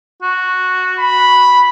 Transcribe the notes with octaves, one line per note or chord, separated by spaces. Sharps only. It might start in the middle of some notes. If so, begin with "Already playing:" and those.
F#4
B5